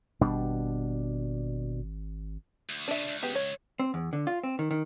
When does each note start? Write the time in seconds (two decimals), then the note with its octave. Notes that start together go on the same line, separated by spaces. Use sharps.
0.21 G#1 B2 G3 D4
2.69 D2
2.88 A#2 C#3 D4 E5
3.08 C#2
3.22 B3 G4 G#4
3.35 C#5
3.80 C4
3.94 E2
4.13 D3
4.27 F4
4.44 C4
4.59 D#3
4.71 D#3